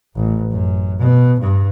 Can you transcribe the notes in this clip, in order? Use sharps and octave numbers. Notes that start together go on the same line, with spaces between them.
A1
F#2
B2
G2